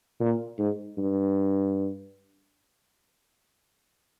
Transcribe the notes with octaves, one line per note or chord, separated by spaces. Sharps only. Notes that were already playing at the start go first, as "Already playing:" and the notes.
A#2
G#2
G2